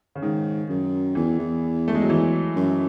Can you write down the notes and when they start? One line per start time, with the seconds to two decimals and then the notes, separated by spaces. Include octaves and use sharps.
0.15 C#3
0.22 G#2 D#3
0.69 F#2
1.15 E2 E3
1.39 E2
1.88 A3
1.95 G#3
2.02 F#3
2.10 E3
2.56 F#2